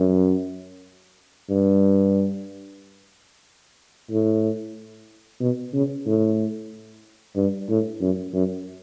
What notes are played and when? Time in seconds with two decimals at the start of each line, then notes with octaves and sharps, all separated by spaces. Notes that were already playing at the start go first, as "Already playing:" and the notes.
Already playing: F#2
1.50 G2
4.11 A2
5.40 B2
5.74 C#3
6.06 A2
7.36 G2
7.69 A2
8.01 F#2
8.34 F#2